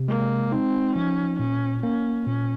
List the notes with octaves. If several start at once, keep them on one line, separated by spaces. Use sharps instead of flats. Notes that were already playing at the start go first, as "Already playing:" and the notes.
Already playing: C3
G#3 A#3
C4 D#4
F3 C#4
A#2 C#4
A#3 C#4
A#2 C#4